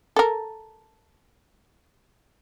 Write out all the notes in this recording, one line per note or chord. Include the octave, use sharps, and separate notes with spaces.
A4 A#4